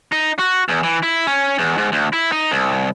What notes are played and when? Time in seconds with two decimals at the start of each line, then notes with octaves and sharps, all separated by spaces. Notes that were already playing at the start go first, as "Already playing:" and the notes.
0.12 D#4
0.39 F#4
0.68 E2
0.83 E3
1.03 E4
1.27 C#4
1.59 E2
1.78 G#2
1.92 D2
2.13 E4
2.32 D#4
2.51 C2